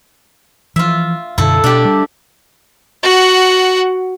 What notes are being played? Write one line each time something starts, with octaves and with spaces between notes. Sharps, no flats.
E3 F3 F4 E5
F#2 B2 D3 E4 A4
B2 D4 G4
G3
F#4 F#5